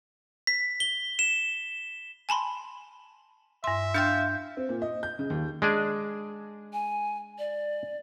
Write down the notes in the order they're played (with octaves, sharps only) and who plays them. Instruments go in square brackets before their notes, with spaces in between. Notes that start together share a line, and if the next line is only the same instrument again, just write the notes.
[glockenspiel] B6
G7
E7
[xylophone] G#5 A5 B5 C6
[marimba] G2 C6 [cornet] E5
[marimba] D4 G5 [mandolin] F5 A5 C6 [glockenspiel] G6
[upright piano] C4
A#2
D#5
G6
C#3
D#2
[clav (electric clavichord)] G#3 D4 G#4
[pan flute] G#5
D5